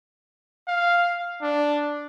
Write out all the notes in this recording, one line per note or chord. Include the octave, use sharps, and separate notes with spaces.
F5
D4